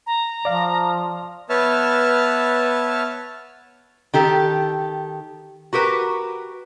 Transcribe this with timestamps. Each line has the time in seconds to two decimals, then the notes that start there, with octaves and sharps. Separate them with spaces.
0.07 A#5
0.45 F3 D5 F5
1.50 B3 B4 C#5 E5 A5 F6
4.14 D#3 G4 A4
5.73 F#4 G4 A#4 B4